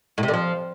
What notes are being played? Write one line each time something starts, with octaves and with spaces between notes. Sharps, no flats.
A2
C3
D3
F3